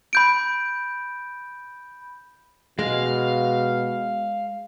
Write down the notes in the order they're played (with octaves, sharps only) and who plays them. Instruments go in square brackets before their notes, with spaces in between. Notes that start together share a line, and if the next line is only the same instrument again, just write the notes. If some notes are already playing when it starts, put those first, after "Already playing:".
[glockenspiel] B5 G6 D7
[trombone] B2 [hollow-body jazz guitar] G#3 [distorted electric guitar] F5